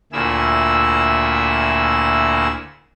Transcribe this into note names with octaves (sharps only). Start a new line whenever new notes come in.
D2 A#2 E4 G#4 E6